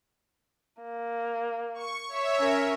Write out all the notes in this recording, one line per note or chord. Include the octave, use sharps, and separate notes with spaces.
A#3
C#6
C#5 E5
C#4 A#4